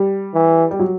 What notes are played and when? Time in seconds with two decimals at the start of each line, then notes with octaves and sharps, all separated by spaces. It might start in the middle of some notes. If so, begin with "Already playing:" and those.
Already playing: G3
0.34 E3
0.71 G3
0.79 F#3